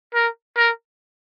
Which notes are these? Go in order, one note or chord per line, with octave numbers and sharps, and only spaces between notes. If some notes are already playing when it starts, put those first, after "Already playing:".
A#4
A#4